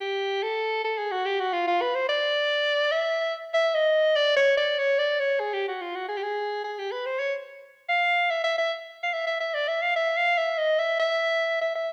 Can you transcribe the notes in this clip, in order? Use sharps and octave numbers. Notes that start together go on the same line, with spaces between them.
G4
A4
A4
G#4
F#4
G4
F#4
F4
F4
B4
C5
D5
E5
E5
D#5
D5
C#5
D5
C#5
D5
C#5
G#4
G4
F#4
F4
F#4
G#4
G4
G#4
G#4
G4
B4
C5
C#5
F5
E5
E5
E5
F5
E5
E5
E5
D5
E5
F5
E5
F5
E5
D#5
E5
E5
E5
E5